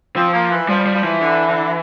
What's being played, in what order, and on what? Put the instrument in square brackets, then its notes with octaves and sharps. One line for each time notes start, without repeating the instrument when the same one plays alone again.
[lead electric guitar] F3 [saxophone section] C4
[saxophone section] A#3
E3
[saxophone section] F3 [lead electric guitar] G3
[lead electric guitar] G3
[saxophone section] F3
[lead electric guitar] E3
[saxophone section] D3
D3